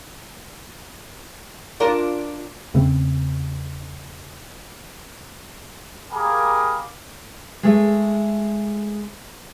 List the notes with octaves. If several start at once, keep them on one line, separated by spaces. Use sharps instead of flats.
D4 F4 A#4
E2 C#3 A3 C4
G3 A#3 G#4 A#4
G#3 A3